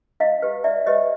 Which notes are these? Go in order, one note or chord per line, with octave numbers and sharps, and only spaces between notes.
E4 D#5 F5
G4 B4
E4 D5 E5
G4 B4 C#5 D#5